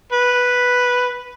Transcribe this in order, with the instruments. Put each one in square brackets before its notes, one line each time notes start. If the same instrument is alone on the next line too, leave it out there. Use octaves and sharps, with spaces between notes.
[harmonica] B4